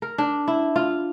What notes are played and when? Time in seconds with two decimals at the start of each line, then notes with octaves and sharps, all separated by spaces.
0.02 A#4
0.18 D4
0.48 E4
0.76 F4